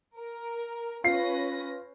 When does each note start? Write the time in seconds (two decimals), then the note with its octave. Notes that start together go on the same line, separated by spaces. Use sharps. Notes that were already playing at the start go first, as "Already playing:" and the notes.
0.17 A#4
1.04 C#4 F4 B4 A#6 C7